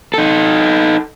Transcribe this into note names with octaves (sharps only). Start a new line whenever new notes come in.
D#4 A4